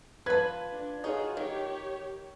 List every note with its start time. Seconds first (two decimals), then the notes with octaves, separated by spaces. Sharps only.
0.26 F4 B4 A5 B5 G#6
0.72 D4
1.04 D#4 F4 F#4 G#4 C#5
1.37 D#3 G4 C#5